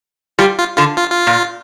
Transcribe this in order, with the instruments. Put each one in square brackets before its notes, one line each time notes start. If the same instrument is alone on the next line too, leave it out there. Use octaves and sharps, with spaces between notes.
[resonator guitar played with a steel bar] G3 [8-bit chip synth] F4
[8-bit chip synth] F4
[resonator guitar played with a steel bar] D3 [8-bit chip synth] F4
[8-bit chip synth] F4
F4
[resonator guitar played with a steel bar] A#2